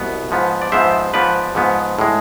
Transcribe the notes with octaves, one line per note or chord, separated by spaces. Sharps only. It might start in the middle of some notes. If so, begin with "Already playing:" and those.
Already playing: C2 B2 B3
G#2 F3 B3
D5
G#2 F3 B3 C5 E5
G#2 F3 B3 B4 D5
G#2 F3 B3
A2 G#3